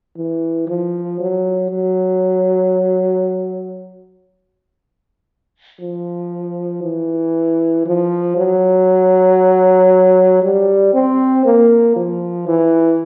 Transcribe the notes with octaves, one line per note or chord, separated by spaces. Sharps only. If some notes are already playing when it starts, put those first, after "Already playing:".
E3
F3
F#3
F#3
F3
E3
F3
F#3
G3
C4
A#3
F3
E3